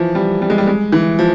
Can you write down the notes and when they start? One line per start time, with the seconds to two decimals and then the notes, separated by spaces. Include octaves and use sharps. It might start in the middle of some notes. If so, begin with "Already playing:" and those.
Already playing: E3 F3
0.15 G3
0.42 G3
0.50 G#3
0.58 G3
0.67 G#3
0.92 E3
1.19 F3